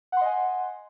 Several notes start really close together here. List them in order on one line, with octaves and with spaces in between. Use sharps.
F#5 C6 D#5 G#5